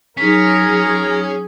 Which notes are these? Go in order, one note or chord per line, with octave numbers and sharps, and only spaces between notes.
F#3 C#4 D#4 G#4 A#4 B6